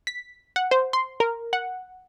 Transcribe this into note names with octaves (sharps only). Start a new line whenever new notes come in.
B6
F#5
C5
C6
A#4
F#5